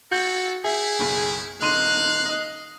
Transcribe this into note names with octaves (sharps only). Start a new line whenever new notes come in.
F#4 A4 G6
D#4 E4 G#4 E5
F#1 B1
D#1 D#4 F5 C6 F#6 D#7
D#5 D#6